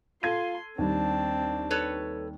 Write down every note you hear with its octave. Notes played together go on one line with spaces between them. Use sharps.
F4 A4 C6 G#6 D#7
D#2 G3 C4 D4 A5
A4 B4 C#5